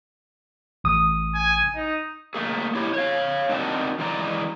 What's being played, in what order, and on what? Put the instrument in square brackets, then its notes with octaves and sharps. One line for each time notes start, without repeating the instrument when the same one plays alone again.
[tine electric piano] A1 D#6
[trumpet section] G#5
D#4
[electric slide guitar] A3 A#3 G#4
E4 G4 C#5
C#5 F5
C4 D4 D#4 F#4 A#4 A5
E3 G#3 D5 A#5